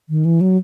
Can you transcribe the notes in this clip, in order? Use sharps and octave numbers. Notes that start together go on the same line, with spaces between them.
D#3
E3
F#3